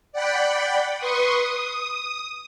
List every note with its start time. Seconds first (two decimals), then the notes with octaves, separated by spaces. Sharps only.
0.12 D5 F#5 G5 B5
0.98 B4 C6 C#6 D#6
1.37 D#6